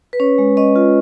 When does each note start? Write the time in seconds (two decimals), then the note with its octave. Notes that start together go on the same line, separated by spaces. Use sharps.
0.13 B4
0.20 C#4 C#5
0.38 G#3
0.57 C#4 D#5
0.76 F4